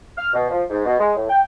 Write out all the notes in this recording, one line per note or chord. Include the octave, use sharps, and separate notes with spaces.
F6
B2
F3
G#2
B2
G#3
A2
G5